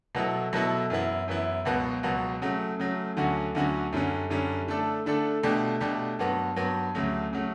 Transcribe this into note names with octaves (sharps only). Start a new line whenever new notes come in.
B2 F#3 B3 E4 A4
B2 F#3 B3 E4 A4
F#2 E3 B3 E4
F#2 E3 B3 E4
C#2 B2 F#3 B3 F#4
C#2 B2 F#3 B3 F#4
C#3 F#3 A3
C#3 F#3 A3
D2 D3 F#3 C#4 F#4
D2 D3 F#3 C#4 F#4
F#2 D3 G3 C#4
F#2 D3 G3 C#4
D3 A3 D4 A4
D3 A3 D4 A4
B2 A3 D4 G4
B2 A3 D4 G4
G2 F#3 B3
G2 F#3 B3
D2 C#3 F#3 A3
C#3 F#3 A3